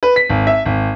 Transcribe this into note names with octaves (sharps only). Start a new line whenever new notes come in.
B4
B6
G#1
E5
G#1